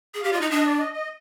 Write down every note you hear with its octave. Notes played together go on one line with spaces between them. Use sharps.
G#4
G4 F5
F4 D5 D#5
D#4
D4 D#5
D5
D#5
D#5